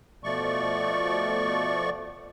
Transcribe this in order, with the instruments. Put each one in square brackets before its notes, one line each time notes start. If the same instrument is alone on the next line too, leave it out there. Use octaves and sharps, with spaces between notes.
[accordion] B2 F3 A3 D5 C#6